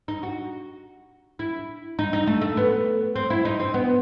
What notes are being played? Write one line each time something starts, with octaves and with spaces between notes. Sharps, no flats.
D#4
F#4
E4
D#4
D#4
A3
A3
B3
C4
E4
D#4
C4
B3